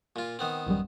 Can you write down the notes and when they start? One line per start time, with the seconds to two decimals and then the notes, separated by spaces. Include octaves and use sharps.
0.16 A#2 F4
0.39 D#3 B3 C4
0.67 A1 F#2 G3